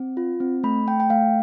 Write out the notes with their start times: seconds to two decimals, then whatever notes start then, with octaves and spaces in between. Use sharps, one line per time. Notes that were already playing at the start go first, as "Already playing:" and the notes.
Already playing: C4
0.17 F4
0.40 C4
0.64 A3 B5
0.87 A3 G5
1.00 G5
1.10 A3 F5